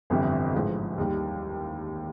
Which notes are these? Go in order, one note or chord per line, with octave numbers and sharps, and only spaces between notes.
G1 F2 C3 E3 G3
A1 G#2 F3
D#2 D#3 G3